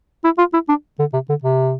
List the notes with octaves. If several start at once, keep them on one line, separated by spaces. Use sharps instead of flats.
E4
F4
E4
D4
D3
C3
D3
C3